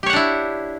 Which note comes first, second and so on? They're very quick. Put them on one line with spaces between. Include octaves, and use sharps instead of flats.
G4 C#5 F#5 D4 E4